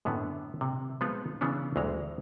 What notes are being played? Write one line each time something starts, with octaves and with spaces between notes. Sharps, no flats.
F#2 A2 D3 B3
C3
F3 G#3 B3 D#4 F4
C#3 E3 B3 C#4 D4
D2 E3 G#3 A#5